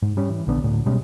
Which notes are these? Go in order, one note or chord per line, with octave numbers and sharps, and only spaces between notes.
G#2
G3 C#4
E3
A#1 D3 B3 D4
D2 A2
B2 G3 G#3 C#4